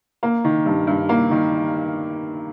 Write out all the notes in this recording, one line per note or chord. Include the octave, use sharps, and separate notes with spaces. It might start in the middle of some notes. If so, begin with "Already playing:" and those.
A#3
D#3
G2
G2
A#3
D#3